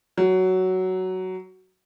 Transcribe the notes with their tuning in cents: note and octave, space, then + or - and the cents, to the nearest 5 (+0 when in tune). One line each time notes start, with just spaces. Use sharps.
F#3 +10